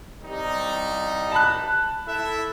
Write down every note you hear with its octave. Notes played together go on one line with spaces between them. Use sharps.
C2 G3 D#4
A5 B5 F#6
E4 A4 E5